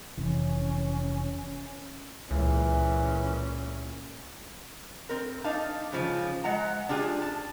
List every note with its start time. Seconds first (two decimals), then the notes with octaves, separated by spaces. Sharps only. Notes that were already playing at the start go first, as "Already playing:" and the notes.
0.17 F1 E3 C#4
2.31 C#2 A#2 E3 C#4
5.09 C4 A#4
5.44 D4 D#4 F5 A5
5.92 G#2 C#3 F3
6.44 G#3 F#5 A#5
6.89 D4 F4 G4 G#4
7.22 A5